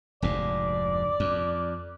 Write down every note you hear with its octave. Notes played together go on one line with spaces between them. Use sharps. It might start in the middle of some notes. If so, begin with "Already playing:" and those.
F1 D2 G#2 D5
F2